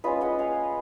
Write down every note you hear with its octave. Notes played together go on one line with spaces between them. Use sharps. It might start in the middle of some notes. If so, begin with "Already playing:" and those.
G#3 C#4 F4 B4 D#5
D#5 F#5
F5 G#5